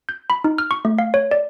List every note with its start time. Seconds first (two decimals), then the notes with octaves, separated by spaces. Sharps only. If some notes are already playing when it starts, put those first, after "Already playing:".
0.09 G6
0.30 B5
0.44 D#4
0.58 F6
0.71 C#6
0.85 A3
0.99 F5
1.14 C#5
1.31 D5